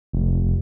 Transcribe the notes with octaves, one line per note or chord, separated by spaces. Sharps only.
F1